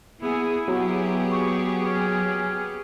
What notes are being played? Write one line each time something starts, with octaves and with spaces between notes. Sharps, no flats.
B3 E4 G#4
F#3 B3 G4 G#4
C#6
C#4